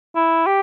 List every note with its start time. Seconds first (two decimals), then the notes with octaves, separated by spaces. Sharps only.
0.16 E4
0.47 G4